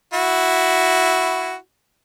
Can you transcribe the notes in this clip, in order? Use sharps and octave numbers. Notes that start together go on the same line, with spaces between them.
E4 F#4